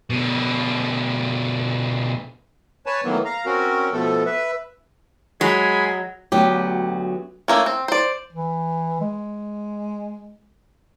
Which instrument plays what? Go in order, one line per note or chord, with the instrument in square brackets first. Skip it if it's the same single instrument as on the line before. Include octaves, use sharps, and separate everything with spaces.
[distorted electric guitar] B2 D3
[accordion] B4 C#5 G#5 A5
A2 D#3 E3 F#3 A#3 B3
F5 A#5
C4 C#4 F#4 A#4
B2 F3 A3 B3 A4
B4 E5
[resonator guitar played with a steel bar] F#3 [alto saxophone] G#3 [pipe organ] G#5 B5
[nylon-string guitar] D2 F#3 B3 G4
[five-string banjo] A3 A#3 C#4
C4
C5 D5
[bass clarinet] E3
G#3